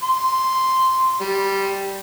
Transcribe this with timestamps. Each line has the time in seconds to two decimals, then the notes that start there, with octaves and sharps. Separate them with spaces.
0.04 C6
1.21 G3